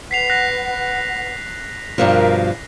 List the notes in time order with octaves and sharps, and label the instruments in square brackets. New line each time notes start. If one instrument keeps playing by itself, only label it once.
[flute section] B4 F#5 [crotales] B6 C7 F7
[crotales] F#6 A#6 B6
[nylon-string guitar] G2 B2 F3 [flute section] A#4